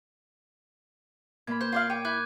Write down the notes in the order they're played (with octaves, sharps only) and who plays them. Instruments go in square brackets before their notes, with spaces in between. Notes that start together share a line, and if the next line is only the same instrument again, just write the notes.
[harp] A#2 A#3 B5 [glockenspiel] G#6
[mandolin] C5 [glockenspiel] G6
[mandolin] F4 D5 F5
[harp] C#5 [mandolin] G5 [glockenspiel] D6 D#7
[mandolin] E4 [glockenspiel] D6 F#6 G#6